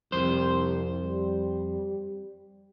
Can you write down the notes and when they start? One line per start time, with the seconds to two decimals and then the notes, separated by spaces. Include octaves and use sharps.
0.12 C2 F2 C5
1.03 G3